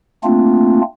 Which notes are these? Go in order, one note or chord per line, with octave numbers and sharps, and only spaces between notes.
A3 A#3 C4 D4 F4